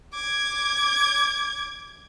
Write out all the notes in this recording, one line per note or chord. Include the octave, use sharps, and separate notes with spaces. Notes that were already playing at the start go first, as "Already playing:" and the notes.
D6 G#6